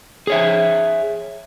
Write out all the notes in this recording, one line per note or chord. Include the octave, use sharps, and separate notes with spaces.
G#4 C#5 E5